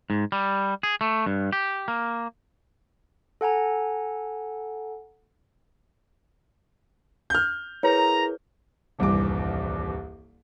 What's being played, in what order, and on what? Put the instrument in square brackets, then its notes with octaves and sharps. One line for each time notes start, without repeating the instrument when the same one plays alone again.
[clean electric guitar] G#2
G3
G#4
A3
G2
G4
A#3
[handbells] A4 F#5 G#5 A#5
[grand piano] F6 G6
[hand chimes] E4 G#4 A#4 [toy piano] B4 C#5 [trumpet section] A#5
[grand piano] D#1 C2 G2 E3 D6